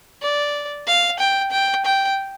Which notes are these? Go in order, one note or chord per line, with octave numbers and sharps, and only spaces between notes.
D5
F5
G5
G5
G5